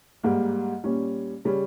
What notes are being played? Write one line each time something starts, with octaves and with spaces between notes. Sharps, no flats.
G#2 G3 A#3
A#2 G3 C#4
C#3 G3 C#4